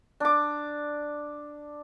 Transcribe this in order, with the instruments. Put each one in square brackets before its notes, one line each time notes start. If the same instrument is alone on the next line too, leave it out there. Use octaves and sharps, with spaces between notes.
[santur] D4 D6